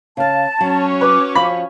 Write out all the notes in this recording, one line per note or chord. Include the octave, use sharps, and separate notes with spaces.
C#3 F5 A5
F#3 C#4 F#4 C#5
B4 D6
F3 B5